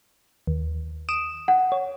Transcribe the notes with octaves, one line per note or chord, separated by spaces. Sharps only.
D#2
D#6 D7 E7
F#5
C#5